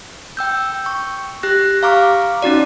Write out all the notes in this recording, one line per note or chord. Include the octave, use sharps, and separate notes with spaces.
G5 E6 G6
C#6
G4 F#6 A#6
F5 A#5 C#6 D6 F6
C#4 D#4 F#4 D5